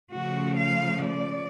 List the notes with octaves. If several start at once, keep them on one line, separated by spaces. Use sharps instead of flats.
C#3 F3 A3 F#4
F5
D5